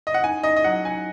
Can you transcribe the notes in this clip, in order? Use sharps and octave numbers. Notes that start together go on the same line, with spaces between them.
D#5
F#5
D#4 G#5
D#4 D#5
D#5
F#3 F#5
D#4 G#5